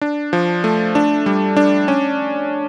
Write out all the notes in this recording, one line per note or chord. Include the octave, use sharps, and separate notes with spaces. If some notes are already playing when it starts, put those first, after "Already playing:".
D4
F3
A3
D4
G3
D4
C#4